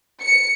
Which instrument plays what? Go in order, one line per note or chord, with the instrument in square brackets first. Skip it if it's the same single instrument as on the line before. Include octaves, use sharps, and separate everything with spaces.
[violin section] C#7